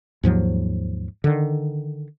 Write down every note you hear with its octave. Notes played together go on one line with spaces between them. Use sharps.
D#2 G#2 F3 F#3
D3 D#3